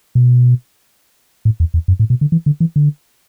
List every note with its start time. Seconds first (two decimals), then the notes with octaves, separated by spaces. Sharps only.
0.15 B2
1.45 A2
1.60 E2
1.74 E2
1.88 F#2
2.00 A2
2.10 B2
2.21 D3
2.32 E3
2.46 D3
2.60 E3
2.76 D3